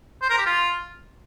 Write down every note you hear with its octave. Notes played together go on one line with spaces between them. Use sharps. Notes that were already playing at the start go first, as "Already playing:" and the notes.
C5
A#4
G4
F4